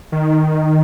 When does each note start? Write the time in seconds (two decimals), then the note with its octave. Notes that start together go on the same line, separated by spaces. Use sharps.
0.12 D#3